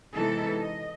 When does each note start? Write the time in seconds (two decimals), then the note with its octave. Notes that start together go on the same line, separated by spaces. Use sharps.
0.14 C3 E3 G#3 B3 D#4 A4
0.61 D#5